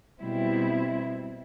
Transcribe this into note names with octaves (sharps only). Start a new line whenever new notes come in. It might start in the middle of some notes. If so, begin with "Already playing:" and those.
B2 G3 C4 E4